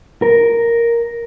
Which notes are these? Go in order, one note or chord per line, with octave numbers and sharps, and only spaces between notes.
A#4